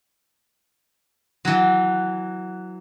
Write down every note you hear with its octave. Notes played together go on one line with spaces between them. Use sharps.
E3 F#3